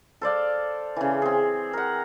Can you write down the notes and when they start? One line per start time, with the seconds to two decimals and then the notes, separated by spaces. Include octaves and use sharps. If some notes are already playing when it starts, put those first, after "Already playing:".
0.21 A4 C5 D5 F5
0.96 C#3 E3
1.22 C4 G#4
1.73 A#4 F#5